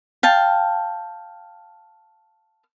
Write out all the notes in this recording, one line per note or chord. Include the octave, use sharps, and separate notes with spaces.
F5 G5 A5